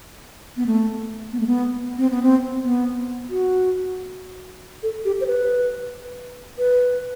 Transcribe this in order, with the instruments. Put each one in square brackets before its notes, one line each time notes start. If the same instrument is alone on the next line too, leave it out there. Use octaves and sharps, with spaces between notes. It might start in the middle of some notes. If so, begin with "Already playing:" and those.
[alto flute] B3
A3
B3
A3
B3
C4
B3
C4
B3
F#4
A4
G4
C5
B4
B4